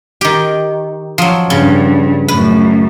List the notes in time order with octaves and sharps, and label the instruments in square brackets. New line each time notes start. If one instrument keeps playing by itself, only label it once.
[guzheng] D#3 G4
F3 F#3
[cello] G2 [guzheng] C#3
[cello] F#2 A2 [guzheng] B4